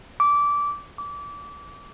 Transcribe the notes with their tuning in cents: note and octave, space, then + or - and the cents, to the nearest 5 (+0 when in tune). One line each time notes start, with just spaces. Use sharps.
D6 -15
D6 -25